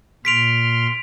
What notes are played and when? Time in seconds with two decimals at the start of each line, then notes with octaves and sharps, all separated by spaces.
0.25 A#2 C6 F6 B6 D7 F7